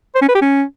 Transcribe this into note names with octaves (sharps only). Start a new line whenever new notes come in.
C5
C#4
B4
G4
C#4